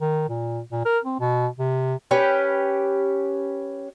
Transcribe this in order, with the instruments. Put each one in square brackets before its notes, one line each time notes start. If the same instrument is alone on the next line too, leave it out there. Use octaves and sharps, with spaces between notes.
[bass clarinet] D#3
A#2
A#2
A#4
C4
B2
C3
[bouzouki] C#4 G4 B4